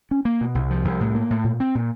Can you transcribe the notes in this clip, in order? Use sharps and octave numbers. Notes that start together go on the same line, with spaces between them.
C#4
A#3
B2
C2
F3
C2
A2
A#3
A2
A#2
C4
A#2